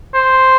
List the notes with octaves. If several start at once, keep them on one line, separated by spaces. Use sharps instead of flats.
C5